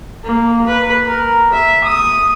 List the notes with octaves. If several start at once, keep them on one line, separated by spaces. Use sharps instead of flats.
A#3
B4
A#4
E5
D#6